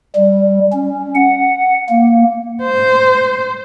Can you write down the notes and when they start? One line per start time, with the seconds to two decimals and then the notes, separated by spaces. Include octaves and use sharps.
0.16 G3
0.73 C#4
1.15 F#5
1.89 A#3
2.63 C5